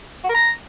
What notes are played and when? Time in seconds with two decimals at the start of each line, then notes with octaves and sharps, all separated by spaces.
0.24 F#4
0.29 A#4
0.35 A#5